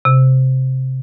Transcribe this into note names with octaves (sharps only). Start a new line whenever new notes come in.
C3